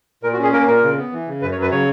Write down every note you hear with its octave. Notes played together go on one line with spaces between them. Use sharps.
A#2 A#4
F#4
C#4
G#4
A#3 A#4
A#2 A#4
C#3
B3
E3
C#3
F#2 B4
C#5
F#3 B4
C#3 C#5